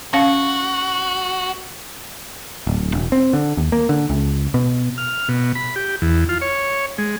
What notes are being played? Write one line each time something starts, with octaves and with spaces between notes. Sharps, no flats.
C#4 F#4 F5
D1
E1
C4
D3
D#2
A#3
D3
C#2
B2
F6
B2
B5
G4
E2
F4
C#5
G#3